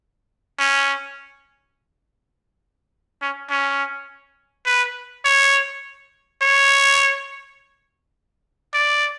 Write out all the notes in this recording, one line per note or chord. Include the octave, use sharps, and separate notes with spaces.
C#4
C#4
C#4
B4
C#5
C#5
D5